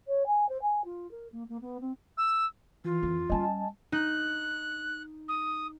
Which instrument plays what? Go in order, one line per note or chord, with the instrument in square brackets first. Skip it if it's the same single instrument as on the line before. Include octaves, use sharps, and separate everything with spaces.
[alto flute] C#5
G#5
C5
G#5
F4
A#4
A#3
A#3
B3
C4
[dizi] E6
[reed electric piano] E3 [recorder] F4
[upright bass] F2
[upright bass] G3 C#4 [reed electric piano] D#5 G#5 A5
[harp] D#4 [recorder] F#6
[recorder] D#6